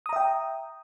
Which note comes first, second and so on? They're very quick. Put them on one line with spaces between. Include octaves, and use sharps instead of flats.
D#6 A#5 E5 G5